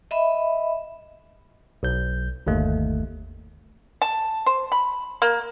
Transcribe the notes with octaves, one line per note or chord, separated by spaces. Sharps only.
D#5 E5 B5
B1 G6
G1 D#2 A3
A5
C5
B5
A#3